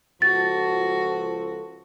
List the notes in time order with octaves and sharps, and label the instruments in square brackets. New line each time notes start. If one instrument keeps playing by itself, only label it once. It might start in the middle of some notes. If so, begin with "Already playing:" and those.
[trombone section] C#2 F3 A4 [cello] F#4 [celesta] A6